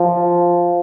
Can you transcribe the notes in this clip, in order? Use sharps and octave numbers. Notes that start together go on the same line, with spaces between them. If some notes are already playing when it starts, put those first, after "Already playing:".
Already playing: F3